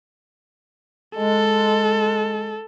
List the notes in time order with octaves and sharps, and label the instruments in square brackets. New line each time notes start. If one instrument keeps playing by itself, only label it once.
[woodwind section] G#3 [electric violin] A4